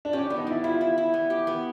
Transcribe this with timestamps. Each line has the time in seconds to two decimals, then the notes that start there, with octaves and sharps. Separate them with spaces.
0.05 D4
0.13 C#4 G4
0.26 D4
0.30 B3
0.38 D#4
0.47 G3 E4
0.63 E4 F4
0.81 E4
0.98 E4
1.14 B3
1.30 G4
1.47 B3